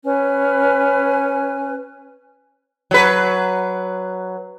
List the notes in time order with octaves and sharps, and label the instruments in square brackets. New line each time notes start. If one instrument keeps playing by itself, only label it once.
[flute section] C#4 B4 G#5
[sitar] F#3 B4